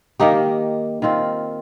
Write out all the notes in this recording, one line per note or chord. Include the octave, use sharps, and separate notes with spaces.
D#3 A#3 D#4 G4
D#3 C4 F4